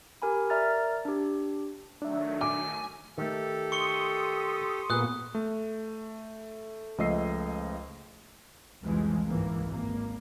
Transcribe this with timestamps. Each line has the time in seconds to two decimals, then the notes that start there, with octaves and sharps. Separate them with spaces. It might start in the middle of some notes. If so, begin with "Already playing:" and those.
0.22 G4 A#4 G#5 B5
0.50 A#4 D5 E5 A#5 F6 A6
1.05 D4 G4
2.02 D#3 F#3 A3 D4 E5
2.41 G#5 D6
3.18 D#3 A3 G4 A4
3.72 C6 C#6 D#6 C#7 G7
4.90 A#2 A#3 B3 G#4 B4 D#6 F#6
5.35 A3
6.98 C#2 F3 A3 D#5 E6 C7
8.84 C2 F2 C#3 E3 F3 G#3
9.27 G1 C#2 G#2 E3 A#3
9.68 G#1 A#3